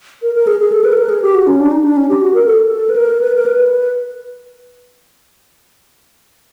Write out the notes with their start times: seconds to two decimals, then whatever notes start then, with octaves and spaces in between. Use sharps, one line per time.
0.22 A#4
0.35 A#4
0.47 G#4
0.60 G#4
0.72 A4
0.84 B4
0.92 A4
0.97 A#4
1.09 G#4
1.22 G4
1.34 F#4
1.47 C#4
1.60 D4
1.72 D#4
1.84 D4
1.97 C#4
2.09 G4
2.22 F#4
2.34 A#4
2.46 A4
2.72 A4
2.89 B4
2.96 A#4
3.21 B4
3.35 A#4
3.46 B4